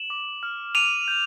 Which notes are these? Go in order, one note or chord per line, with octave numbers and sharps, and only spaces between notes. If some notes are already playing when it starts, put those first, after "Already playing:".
Already playing: E7 F#7
D6
F6
D6 D#7 F7
G6